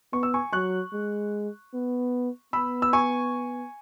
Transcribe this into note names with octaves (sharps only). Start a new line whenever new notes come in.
B3 C#6
E6
G#5 C#6
F#3 C#6 F#6
G#3
B3
B3 B5 E6
E6
G#5 C#6